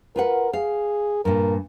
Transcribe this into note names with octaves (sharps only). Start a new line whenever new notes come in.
F4 A#4 B4 F#5
G#4 F5
G2 A#2 A#4